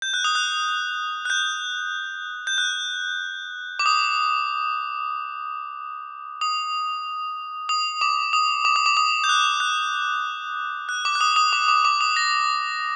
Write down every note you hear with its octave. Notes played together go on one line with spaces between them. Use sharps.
G6
F#6
D#6
F#6
F#6
G6
G6
F#6
D6
D#6
D#6
D#6
D6
D#6
D6
D#6
D6
D#6
G6
F#6
F#6
F#6
D6
F#6
D#6
D#6
D6
D6
D6
D#6
A#6